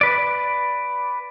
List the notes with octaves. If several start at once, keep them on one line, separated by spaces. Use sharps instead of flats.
B4 D5